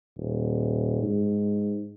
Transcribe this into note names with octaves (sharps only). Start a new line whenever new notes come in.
D#1
G#2